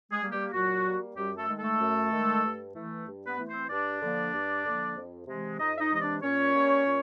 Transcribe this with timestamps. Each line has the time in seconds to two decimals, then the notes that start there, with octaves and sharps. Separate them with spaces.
0.12 G#3 G#4
0.22 G3 A#3
0.32 G3 G4
0.53 A#2 F#3 F#4
0.85 G3 A#3
1.16 F#2 G3 G4
1.37 A3 A4
1.48 D#3 G#3
1.59 A3 A4
1.79 F#2
2.11 D#3 G#3
2.44 G2
2.75 E3 A3
3.07 G2
3.27 B3 B4
3.38 E3 A3
3.49 C4 C5
3.70 G2 D4 D5
4.01 D3 F3 A#3
4.33 G2
4.64 D3 F3 A#3
4.96 F2
5.27 C3 E3 G#3
5.59 F2 D#4 D#5
5.76 E5
5.80 D#4 D#5
5.91 C3 E3 G#3 D#5
6.01 D4 D5
6.22 A#2 C#4 C#5
6.53 G3 A#3
6.86 A#2